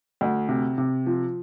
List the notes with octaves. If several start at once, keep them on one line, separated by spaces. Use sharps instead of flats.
D2
C3
C3
F3